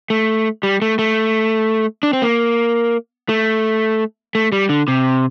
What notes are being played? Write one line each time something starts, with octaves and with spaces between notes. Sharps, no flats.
A3
G3
A3
A3
D4
C4
A#3
A3
A3
G3
D3
C3